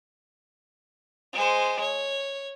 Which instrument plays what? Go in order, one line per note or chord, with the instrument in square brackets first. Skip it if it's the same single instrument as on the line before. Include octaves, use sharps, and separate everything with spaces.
[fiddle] G#3 C5
C#5